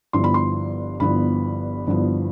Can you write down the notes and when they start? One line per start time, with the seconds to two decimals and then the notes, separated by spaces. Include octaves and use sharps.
0.13 G1 G2 F3 B3 E4 C6
0.24 B5
0.34 C6
1.00 G1 G2 F3 B3 E4 B5
1.87 G1 G2 F3 B3 E4